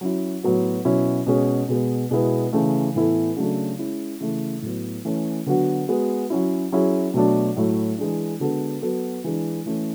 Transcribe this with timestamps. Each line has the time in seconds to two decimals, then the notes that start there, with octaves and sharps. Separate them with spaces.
0.01 F#3 C#4 E4
0.43 A2 F#3 B3 F#4
0.85 B2 F#3 C#4 E4
1.27 B2 G#3 C#4 G#4
1.69 B2 G#3 B3
2.11 B2 G#3 B3 E4
2.53 C#3 E3 A3
2.95 A2 E3 B3 E4 A4
3.36 C#3 F#3 A3 D4 A4
3.78 G#3 C#4 E4
4.20 C#3 E3 A3 E4
4.62 A2 F#3 B3
5.05 E3 A3 C#4
5.46 D3 F#3 B3 F#4
5.88 G#3 B3 F#4
6.30 F#3 C#4 E4
6.72 F#3 C#4 E4 G#4
7.14 B2 F#3 A3 D4
7.56 A2 F#3 A3 E4
7.98 E3 G#3 D4
8.40 D3 G#3 B3 F#4 A4
8.82 F#3 B3 F#4 A4
9.24 E3 G#3 D4
9.66 E3 A3 C#4